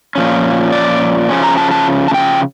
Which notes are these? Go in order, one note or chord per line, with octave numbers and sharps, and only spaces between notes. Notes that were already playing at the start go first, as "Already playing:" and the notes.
A#2 F3 C#4
D5
C#3 F3 C#4
A#5
A5
A5
A5
G5